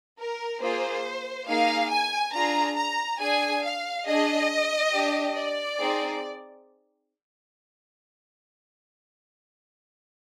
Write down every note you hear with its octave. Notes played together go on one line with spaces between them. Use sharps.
A#4
A#3 F4 G#4 C5
A#3 D#4 G#4 F5
G#5
D4 F4 G#4 A#5
A#5
D4 G#4 G#5
F5
D4 G#4 D#5
D4 G4
D5
C4 D#4 G#4